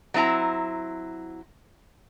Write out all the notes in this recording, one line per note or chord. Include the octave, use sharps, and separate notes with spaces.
F#3 C4 E4 A#5